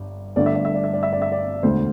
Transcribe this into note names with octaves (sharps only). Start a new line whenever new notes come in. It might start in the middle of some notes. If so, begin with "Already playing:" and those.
Already playing: G1 G2 G3
G1 G2 D3 A3 D5
E5
D5
E5
D5
E5
D5
E5
D5
E5
D5
E1 D2 D3 C5